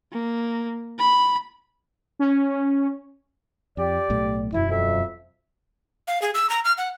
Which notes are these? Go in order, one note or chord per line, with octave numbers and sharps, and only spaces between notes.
A#3
B5
C#4
F2 G4 D5
B1 A2 A3
E1 F#2 F#3 E4
F2 E5
F5
G#4
E6
A#5
F6
F#5